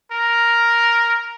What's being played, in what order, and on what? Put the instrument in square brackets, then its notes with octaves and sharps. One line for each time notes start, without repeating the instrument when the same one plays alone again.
[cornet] A#4